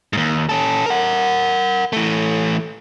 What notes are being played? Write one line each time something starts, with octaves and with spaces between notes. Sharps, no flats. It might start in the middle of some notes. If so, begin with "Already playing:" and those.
D#2 G#2
C#4 A4
A#4 F#5
E3 A3